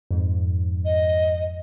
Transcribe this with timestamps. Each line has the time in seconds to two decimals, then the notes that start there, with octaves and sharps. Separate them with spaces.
0.11 F2 G#2
0.85 D#5